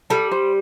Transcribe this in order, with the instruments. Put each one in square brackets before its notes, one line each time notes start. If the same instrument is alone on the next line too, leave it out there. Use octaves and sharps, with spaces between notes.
[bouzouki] G3 [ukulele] A4
[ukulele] C5